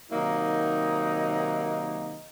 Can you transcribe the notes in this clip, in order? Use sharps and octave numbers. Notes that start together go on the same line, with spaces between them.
C3 D#3 F#3 A#3 D#4